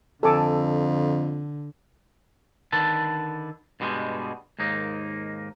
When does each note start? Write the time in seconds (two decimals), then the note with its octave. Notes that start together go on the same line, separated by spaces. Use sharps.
0.23 F2 D3 A4 G#5 D6
2.72 D3 D#3 A4 B4 A5
3.80 G2 B2 G3 G#3
4.59 D#2 G#2 A#3 D#4